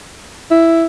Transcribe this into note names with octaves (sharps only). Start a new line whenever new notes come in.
E4